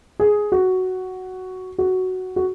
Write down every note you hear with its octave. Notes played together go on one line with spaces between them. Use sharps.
G#4
F#4
F#4
F#4